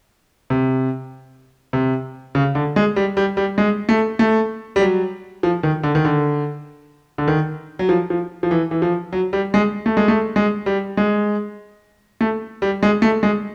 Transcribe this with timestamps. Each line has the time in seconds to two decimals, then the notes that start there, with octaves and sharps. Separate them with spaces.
0.50 C3
1.73 C3
2.35 C#3
2.55 D3
2.76 G#3
2.96 G3
3.17 G3
3.37 G3
3.58 G#3
3.89 A3
4.19 A3
4.76 G3
4.81 F#3
5.43 F3
5.63 D#3
5.83 D3
5.95 D#3
6.05 D3
7.18 D3
7.28 D#3
7.79 F#3
7.89 F3
8.10 F3
8.43 F3
8.51 E3
8.71 E3
8.82 F3
9.12 F#3
9.33 G3
9.54 G#3
9.86 A3
9.97 G#3
10.08 A3
10.36 G#3
10.66 G3
10.97 G#3
12.21 A3
12.62 G3
12.83 G#3
13.02 A3
13.23 G#3